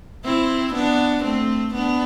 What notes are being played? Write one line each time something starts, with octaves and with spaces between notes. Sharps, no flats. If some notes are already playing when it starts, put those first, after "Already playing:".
C4 E4
B3 D4
A3 C4
B3 D4